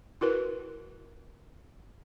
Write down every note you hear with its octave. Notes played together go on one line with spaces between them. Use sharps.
E4 F#4 A#4 B4